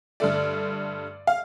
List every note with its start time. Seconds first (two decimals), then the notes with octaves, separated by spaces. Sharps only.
0.20 G2 D3 A3 D5
1.27 F5